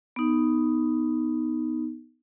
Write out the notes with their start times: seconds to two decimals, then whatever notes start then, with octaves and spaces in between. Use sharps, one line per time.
0.16 B3 D#4